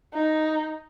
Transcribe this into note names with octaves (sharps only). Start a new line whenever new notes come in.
D#4